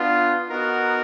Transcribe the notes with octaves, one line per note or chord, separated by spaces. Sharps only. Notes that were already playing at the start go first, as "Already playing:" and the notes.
Already playing: B3 D4 F4
B3 D#4 F#4 A#4